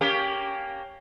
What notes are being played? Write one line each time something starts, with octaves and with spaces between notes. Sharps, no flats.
A#3 C#4 G4